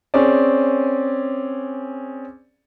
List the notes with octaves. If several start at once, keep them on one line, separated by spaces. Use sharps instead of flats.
C4 C#4 G#4 D5